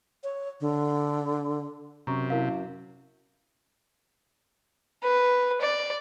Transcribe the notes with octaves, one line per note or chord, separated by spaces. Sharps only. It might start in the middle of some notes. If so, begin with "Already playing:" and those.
C#5
D3
F#2 C3 A#5 C#6
E4 A#4 F5
B4
D5